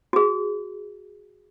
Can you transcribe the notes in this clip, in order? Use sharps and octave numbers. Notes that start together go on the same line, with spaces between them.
F#4 G#4